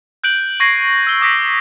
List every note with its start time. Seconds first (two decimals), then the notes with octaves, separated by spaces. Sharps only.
0.24 F#6 G6 D7 F#7
0.60 C#6 G#6 A#6 C7
1.07 E6 G7
1.21 D6 D#6 G6 A#6 B6 D7